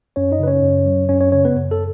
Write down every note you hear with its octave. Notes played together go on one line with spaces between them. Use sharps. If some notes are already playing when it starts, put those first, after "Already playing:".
F#2 C#4 C#5
D#4 D#5
C#3 B4
C#4 C#5
F#2
F#3
F#2 C#4 C#5
C#4 C#5
C#3 C#4 C#5
B3 B4
F#2
A4